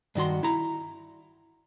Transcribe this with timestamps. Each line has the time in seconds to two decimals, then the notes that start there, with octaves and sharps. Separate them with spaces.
0.15 G2 D#3 F#4 C6
0.43 E4 A#5